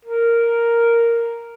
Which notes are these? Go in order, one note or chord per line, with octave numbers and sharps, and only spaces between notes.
A#4